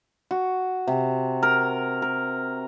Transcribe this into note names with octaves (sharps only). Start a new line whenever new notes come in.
F#4
C3
A#4
A#4